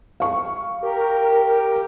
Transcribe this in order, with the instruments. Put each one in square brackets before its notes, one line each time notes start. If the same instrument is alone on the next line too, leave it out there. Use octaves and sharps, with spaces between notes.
[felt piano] F5 C#6
[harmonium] G4 [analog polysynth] A#4